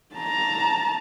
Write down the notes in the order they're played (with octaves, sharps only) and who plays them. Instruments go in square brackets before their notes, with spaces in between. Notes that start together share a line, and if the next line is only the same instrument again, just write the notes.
[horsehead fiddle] A5 A#5